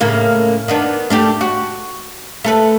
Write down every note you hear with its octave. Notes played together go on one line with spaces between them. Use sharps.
A2 C#3 A#3
D#3 B3 D4
A3 D4 G4
F#4
A3 A4 B4